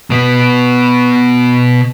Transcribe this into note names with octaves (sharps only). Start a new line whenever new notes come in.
B2 B3